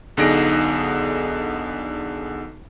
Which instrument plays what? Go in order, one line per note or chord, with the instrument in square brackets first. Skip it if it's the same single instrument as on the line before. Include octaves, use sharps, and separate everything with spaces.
[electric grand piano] B1 D3 D#4 G#4 A#6 D7